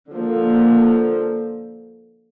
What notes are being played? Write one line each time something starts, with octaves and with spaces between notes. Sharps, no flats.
D3 F3 A#3